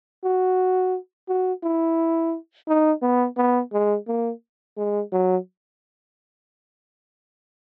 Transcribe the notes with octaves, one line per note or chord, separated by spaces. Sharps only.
F#4
F#4
E4
D#4
B3
B3
G#3
A#3
G#3
F#3